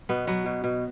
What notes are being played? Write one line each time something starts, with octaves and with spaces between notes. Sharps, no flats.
B2 B3
F#3 B3
B2
B2